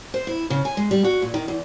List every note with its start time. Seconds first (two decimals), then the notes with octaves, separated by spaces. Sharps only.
0.14 C5
0.27 E4
0.50 C#3
0.65 G#5
0.77 G#3
0.91 G3
1.04 F#4
1.22 A#2
1.34 D#3
1.48 E2